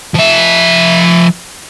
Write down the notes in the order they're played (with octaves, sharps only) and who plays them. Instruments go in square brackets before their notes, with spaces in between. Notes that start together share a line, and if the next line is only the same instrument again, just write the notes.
[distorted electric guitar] F3 E5